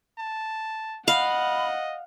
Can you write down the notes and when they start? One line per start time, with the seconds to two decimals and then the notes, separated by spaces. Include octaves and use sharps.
0.18 A5
1.08 D#5 F5 F#5 B5